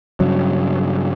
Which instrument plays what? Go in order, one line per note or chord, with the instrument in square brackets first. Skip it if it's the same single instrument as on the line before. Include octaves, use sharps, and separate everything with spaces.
[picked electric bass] G2 C#3 F#3